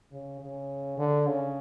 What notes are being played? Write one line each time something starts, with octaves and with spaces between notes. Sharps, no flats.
C#3
C#3
D3
C#3